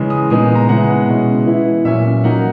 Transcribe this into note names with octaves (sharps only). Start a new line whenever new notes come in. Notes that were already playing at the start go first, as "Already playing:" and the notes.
Already playing: C#3 E3 G#3
D#6
A#2 G#3 B3 D#4 D#6
A#5
C#3 G#3 B3 E4 F#5
B2 G#3 C#4 E4
E3 B3 E4
A#2 F#3 C#4 E5
F#3 A#3 D#4 F#5